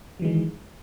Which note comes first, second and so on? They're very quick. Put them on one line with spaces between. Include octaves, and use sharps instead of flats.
F#3 E3 G#3 D#3